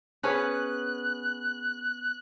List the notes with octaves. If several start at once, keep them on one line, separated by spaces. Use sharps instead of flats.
B3 C#4 G#4 F#6